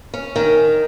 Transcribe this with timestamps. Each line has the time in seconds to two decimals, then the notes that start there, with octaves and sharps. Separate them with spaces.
0.14 C#4
0.36 D#3